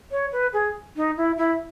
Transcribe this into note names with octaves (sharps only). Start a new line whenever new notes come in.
C#5
B4
G#4
D#4
E4
E4